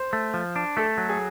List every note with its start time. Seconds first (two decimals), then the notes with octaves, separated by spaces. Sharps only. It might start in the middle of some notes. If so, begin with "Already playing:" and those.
Already playing: C5
0.13 A3
0.34 F3
0.56 D4
0.77 A3 A4
0.98 F#3
1.09 G#4